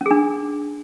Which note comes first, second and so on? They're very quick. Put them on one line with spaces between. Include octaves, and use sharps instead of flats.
C#4 G#4 D4